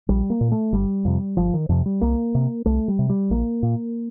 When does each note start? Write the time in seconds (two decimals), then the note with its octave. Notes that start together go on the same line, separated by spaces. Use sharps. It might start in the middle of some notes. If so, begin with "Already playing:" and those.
0.09 A#1 G3
0.30 A#3
0.41 A#2
0.52 A3
0.72 G1 G3
1.05 F2 C3
1.37 G1 F3
1.54 D#3
1.69 F2 C3 F3
1.86 G3
2.01 C2 A#3
2.35 C3
2.66 C2 A3
2.88 G3
2.99 C3
3.09 G3
3.30 A#1 A#3
3.63 A#2